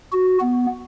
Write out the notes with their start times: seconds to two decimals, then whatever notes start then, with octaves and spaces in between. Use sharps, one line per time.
0.13 F#4
0.41 B3